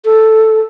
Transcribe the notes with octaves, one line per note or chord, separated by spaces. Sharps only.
A4